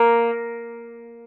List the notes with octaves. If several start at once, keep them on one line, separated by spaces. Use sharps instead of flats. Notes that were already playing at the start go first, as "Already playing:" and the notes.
Already playing: A#3